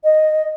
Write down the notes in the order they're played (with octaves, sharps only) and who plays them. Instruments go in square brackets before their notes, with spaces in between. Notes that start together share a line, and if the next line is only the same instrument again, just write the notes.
[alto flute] D#5